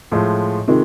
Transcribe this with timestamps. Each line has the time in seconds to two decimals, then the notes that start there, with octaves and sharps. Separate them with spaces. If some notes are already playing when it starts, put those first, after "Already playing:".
0.12 A2 F3 G#3
0.68 C3 D#3 G#3 D#4 F4